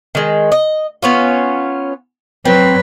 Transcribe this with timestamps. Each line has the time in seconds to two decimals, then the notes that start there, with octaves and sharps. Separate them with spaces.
0.15 D#3 G#3
0.52 D#5
1.02 B3 C#4 F4
2.45 F#3 C4 B4